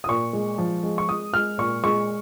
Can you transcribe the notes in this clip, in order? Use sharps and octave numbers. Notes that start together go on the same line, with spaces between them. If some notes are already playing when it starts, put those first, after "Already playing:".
D#6
A#2 C#6
G#3
F3
G#3
C#6
G#3 D#6
G#3 F6
A#2 C#6
G#3 C#6